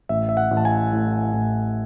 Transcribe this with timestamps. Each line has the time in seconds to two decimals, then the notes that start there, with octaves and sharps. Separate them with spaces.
0.09 A1 E5
0.29 E5
0.37 F#5
0.51 A1
0.57 A5
0.65 G#5
0.93 A2
1.33 A1